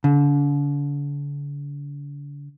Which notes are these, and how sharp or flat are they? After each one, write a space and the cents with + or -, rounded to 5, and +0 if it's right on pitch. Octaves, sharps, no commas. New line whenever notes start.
D3 -40